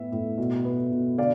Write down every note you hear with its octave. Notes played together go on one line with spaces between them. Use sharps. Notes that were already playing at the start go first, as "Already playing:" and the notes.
Already playing: A2 B3 E5
A2
B2
B3
B2
D3 D5 F5